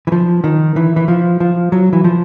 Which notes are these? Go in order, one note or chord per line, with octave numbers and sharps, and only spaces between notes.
E3
F3
D#3
E3
E3
F3
F3
F#3
E3
F3